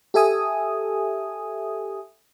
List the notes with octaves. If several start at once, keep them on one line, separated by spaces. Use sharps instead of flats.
G4 A4 E5 G#5 D#6